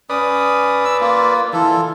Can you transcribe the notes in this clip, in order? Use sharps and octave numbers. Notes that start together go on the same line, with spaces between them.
C#4 B4 D5 D#6
E6
A#3 F4
E3 F4 A4